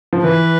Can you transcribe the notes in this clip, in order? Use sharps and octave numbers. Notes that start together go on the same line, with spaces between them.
F3
E3 B4